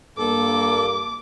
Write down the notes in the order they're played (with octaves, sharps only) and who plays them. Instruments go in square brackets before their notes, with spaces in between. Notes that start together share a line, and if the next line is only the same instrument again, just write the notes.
[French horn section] G2 A#3 [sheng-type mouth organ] A4 [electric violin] D6